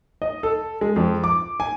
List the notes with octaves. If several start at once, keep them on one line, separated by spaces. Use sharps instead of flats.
D#5
A4
G#3
F2
D6
G#5